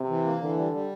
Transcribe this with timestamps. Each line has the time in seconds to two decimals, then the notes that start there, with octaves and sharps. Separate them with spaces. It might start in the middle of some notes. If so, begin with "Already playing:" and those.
Already playing: C3
0.09 E3
0.25 A#3
0.42 D3 E3
0.57 G3
0.73 G3